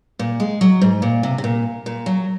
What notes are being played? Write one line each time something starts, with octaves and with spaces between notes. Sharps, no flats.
A#2
G#3
F#3
G#2
A#2
C3
C3
A#2
A#2
F#3